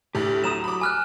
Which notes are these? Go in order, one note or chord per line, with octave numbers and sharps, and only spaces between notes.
D2 A2 G4
F#3 A#5 D#6 E7
B5 D6
G#5 F6 F#6